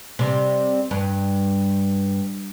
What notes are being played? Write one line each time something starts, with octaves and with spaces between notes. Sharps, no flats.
C3 G3
G2